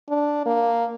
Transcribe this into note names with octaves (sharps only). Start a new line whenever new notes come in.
D4
A#3